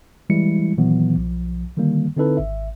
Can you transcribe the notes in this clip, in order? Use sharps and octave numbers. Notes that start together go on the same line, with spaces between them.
E3 G3 G#3 E4 C#7
A#2 D#3 E3 F#3 B3
B1 F3
D3 D#3 G3 A#3
D3 C4 D#4 E4 A4 B4
G#1 E5